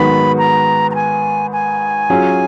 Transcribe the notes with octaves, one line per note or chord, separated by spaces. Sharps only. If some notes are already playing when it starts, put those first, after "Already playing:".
Already playing: G#2 D#3 F#3 B3 F#4 B5
A#5
A#5
G#5
G#5
F#3 C#4 F4 G#4